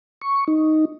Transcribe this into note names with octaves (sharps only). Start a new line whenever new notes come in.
C#6
D#4